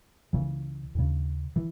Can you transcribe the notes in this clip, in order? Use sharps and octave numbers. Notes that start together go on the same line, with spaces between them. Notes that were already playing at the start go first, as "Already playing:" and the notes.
C#2 C#3 E3
D#2 C#3
E3